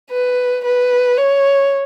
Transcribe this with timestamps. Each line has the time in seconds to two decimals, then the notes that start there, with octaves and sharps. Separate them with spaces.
0.10 B4
0.65 B4
1.17 C#5